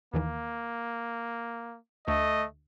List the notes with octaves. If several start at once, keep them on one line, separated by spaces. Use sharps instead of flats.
D#2 D#3 E3 A#3
D2 A3 D#5